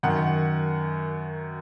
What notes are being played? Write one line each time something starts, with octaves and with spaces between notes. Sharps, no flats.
F#2 D#3 F#5